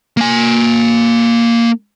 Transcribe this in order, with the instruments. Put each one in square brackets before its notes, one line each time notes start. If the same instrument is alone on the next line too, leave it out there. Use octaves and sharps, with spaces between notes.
[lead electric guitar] A#3 G#5